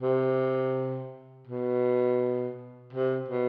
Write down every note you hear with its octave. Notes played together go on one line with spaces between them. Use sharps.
C3
B2
C3
B2